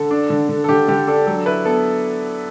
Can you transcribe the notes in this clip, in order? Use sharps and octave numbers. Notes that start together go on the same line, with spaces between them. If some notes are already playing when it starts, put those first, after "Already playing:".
Already playing: D3 A4
D4
D3
D3
A4
D3 G4
D3 G4
D4 A4
F#3 A4
E4 B4
B3 A4